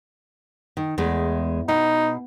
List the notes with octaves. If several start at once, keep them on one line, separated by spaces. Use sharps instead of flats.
D#3
E2 G#3 A3
B2 D#4